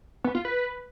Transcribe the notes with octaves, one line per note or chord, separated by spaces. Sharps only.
B3
F4
B4